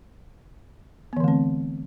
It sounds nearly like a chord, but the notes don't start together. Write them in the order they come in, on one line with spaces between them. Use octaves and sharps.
B3 E3 D3 A3 C4